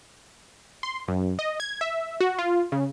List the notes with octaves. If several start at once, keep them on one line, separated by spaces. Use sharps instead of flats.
C6
F#2
D#5
G#6
E5
F#4
F4
C#3